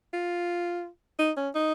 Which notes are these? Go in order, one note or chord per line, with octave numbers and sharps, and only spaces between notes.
F4
D#4
C#4
D#4